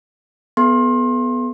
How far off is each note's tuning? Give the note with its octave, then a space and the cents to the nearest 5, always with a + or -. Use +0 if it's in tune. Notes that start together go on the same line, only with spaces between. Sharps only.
B3 +0 A4 -40 C6 +30